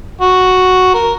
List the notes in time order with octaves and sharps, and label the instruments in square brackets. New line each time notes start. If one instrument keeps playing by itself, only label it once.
[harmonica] F#4
A#4